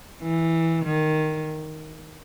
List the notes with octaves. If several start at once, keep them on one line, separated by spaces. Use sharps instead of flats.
E3
D#3